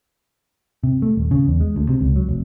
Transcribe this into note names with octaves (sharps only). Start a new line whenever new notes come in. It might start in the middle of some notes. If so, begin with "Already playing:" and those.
C3
A3
D#1
C#3
E2
G#3
D2
C3
C#2
F#3
F1